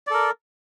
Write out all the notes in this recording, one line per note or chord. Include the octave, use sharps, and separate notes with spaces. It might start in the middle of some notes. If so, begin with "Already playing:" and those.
A4 A#4 D5